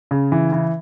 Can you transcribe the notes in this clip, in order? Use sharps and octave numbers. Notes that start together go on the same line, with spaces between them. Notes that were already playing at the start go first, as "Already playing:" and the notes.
C#3
E3
E3